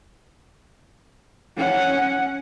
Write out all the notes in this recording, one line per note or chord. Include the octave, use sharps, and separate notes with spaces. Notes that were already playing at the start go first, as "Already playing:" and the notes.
C#4 F#5